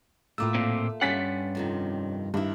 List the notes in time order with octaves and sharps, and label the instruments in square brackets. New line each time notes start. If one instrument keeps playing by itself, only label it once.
[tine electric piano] A2 D6 E6 [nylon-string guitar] A3 A#3 F4
[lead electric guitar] A#2 C4
[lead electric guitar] G2 F#5 [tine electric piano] C#4 C#5 [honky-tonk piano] G#5 A6 B6
[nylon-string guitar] F2 C3 D#3
[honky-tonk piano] G2 [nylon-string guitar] D#3 E4